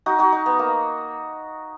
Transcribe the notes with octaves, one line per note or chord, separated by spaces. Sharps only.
D#4 F#4
D#4 F#4
D#4
B3
A#3